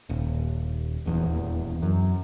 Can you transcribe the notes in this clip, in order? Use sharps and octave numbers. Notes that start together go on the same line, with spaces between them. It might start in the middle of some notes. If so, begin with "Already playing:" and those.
D#1
D#1 E2
F#2